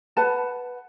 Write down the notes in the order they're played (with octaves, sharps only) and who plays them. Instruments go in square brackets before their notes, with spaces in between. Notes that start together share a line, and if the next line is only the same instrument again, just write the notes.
[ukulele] B4 F#5 A5